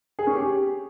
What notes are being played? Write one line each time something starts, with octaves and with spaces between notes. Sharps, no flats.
G#4
C#4
G4